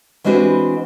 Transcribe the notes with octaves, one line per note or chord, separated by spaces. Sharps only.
E3 G#3 C4 D4 F#4 B4